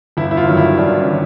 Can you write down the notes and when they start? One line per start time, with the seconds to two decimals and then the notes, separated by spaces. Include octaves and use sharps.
0.17 G1 E4
0.31 E4
0.37 F4
0.47 G2 D#3 F#3
0.57 E4
0.78 G1 D4
0.98 C#4
1.08 D#3 F#3